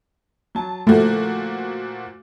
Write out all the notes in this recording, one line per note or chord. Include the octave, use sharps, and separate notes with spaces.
F#3 A5
A#2 F3 A3 F#4